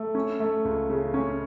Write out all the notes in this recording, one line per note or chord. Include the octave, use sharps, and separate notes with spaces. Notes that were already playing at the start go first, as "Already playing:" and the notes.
Already playing: A3
C#4
A3
C#2
C#3
C#4